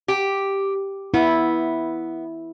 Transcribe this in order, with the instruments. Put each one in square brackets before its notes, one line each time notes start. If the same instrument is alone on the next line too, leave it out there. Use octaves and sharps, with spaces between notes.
[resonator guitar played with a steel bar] G4
[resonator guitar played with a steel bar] B3 [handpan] E4